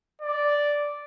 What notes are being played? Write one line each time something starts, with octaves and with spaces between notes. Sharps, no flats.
D5